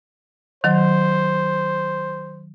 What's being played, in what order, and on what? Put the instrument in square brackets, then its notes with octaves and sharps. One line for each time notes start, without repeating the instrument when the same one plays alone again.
[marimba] D#3 F#3 [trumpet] C5